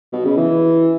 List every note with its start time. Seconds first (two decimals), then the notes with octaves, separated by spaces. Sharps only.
0.13 B2
0.25 C#3
0.37 E3